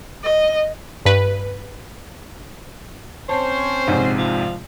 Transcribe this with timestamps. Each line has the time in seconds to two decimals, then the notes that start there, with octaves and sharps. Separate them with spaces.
0.23 D#5
1.05 G2 B4
3.29 C4 C#4 C5 C#5 A5
3.87 A#1 G#2 C3
4.18 F3